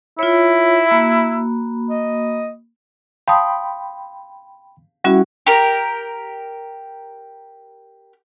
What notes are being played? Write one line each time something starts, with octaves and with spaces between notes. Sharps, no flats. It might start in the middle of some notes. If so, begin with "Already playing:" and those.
E4 F4 C#5
A#3 F#4 B5
D#5
F5 G5 A5 B5 C6 D#6
G3 C#4 E4 F#4 F#5
G4 A#4